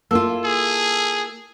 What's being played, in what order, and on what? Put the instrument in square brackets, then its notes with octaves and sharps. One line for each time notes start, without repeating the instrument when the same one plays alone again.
[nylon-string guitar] A#3 E4 F4 [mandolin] A4
[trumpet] G#4